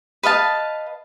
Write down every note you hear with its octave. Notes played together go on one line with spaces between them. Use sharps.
B4 D#5 F5 A5